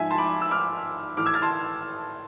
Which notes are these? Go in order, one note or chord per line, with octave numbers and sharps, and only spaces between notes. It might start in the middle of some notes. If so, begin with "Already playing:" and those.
Already playing: G#2 F3 E5 G#5
A5 C6
B5 D6
E6
D6 F6
A2 E3 D6 F6
E6 G#6
F6 A6
A5 C6